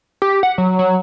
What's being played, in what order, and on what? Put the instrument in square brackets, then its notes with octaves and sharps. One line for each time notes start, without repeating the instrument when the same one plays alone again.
[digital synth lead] G4
F#5
F#3
F#3